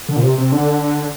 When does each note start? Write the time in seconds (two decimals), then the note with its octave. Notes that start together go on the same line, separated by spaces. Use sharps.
0.09 D3
0.16 A#2
0.23 C3
0.38 C3
0.52 D3